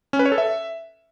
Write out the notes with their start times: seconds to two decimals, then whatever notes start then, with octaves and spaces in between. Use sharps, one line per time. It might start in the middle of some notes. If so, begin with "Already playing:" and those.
0.13 C#4
0.19 B4
0.26 C#5
0.32 A4
0.38 E5